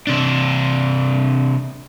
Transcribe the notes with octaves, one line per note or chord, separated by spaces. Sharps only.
C3 D4